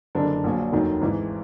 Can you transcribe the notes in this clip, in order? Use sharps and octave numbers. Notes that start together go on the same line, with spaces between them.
F#1 F#2 D3 D4
A#1 A#2 F#3
F1 D#2 D#3 F#3
G#1 G#2 E3